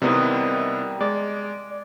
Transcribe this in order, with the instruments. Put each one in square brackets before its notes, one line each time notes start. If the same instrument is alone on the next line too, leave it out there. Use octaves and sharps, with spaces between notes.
[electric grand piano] C3 B3 E4 [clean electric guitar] G3 A#4 D#5
[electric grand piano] G#3 [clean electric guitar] D5